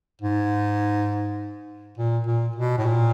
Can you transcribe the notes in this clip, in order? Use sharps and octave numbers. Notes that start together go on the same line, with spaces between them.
G#2
A#2
A#2
B2
A2
A#2